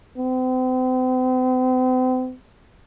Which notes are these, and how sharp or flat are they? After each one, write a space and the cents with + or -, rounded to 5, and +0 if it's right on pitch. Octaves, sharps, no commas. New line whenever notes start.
C4 -40